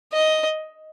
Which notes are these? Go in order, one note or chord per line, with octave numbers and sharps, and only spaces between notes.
D#5